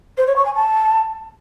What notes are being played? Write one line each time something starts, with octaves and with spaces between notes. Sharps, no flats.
C5
C#5
C#6
G#5
A5